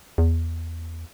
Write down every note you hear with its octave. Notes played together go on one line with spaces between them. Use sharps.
E2